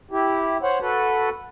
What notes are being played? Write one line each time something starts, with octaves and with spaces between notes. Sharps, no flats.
E4 G4
C5 C#5 F#5
F#4 A4 B4